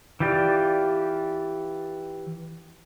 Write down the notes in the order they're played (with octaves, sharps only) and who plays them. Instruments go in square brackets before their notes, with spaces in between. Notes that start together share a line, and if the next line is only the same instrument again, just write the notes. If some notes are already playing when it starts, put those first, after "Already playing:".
[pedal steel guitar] E3 F4 G4 D5